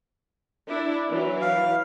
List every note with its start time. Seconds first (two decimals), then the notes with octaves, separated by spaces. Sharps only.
0.69 D4 E4
1.10 E3 F#3 E4
1.42 F5